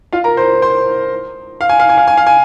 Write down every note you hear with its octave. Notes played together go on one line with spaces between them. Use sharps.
F4 F5
A#4 A#5
C5 C6
C5 C6
F5
G#5
F5
G#5
F5
G#5
F5
G#5